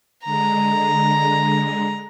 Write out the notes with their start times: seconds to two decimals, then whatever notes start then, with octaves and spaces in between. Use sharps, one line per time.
0.25 D3 G#3 A#5